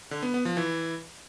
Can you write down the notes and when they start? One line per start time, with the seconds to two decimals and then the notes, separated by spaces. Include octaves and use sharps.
0.11 D3
0.23 B3
0.34 B3
0.45 F3
0.57 E3